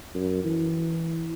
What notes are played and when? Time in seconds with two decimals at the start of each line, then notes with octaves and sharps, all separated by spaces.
0.15 F#2
0.44 E3